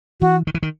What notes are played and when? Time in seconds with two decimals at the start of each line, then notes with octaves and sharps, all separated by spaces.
0.21 E3 F#4
0.47 D#3
0.55 E3
0.63 D#3